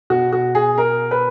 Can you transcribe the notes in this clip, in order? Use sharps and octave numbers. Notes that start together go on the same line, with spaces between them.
B2 F#4
F#4
G#4
A#4
B4